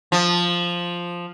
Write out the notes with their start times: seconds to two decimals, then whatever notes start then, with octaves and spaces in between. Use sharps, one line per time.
0.12 F3